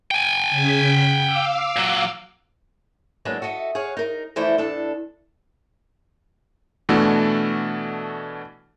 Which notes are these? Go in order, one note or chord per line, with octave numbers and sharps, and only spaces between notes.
G5 G#5
C#3 B6
F5 D6 E6
A#2 F#3
F#3 G#3 A#3 B3 D4
F#4 A4 D#5 E5
G#4 C#5 F5 F#5
D#4 A#4
E3 F3 A3 E4 C5 D5
E2 D4 A4
B2 E3 A3 D4 F#4 A4